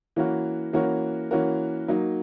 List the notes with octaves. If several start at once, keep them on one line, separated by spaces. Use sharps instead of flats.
E3 A#3 C#4 F#4 A#4
E3 A#3 C#4 F#4 A#4
E3 A#3 C#4 F#4 A#4
F#3 A#3 D#4